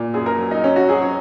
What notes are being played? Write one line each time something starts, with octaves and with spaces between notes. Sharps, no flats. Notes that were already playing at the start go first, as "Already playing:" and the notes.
Already playing: A#2
F#2 G#4
A#4
F#3
D#4
F#3 C#4
F#4
F#3 G#4
C#5